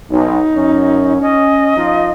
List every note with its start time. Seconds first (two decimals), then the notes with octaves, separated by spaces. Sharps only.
0.11 B1 D#4
0.56 F#2 C#4
1.21 C#4 D#5
1.76 F3 D#4 F4